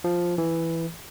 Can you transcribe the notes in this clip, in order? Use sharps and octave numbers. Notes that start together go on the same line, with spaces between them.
F3
E3